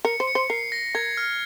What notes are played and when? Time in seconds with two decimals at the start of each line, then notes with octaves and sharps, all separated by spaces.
0.05 A#4 C#7
0.20 C5
0.28 C#7
0.35 C5
0.50 A#4 C7
0.72 A#6
0.95 A#4 G#6
1.17 F6